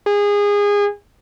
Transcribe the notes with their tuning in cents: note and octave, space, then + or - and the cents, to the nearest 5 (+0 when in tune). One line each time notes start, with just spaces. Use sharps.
G#4 -25